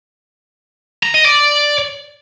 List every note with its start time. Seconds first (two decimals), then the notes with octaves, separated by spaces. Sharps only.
1.03 A#5
1.14 D#5
1.25 D5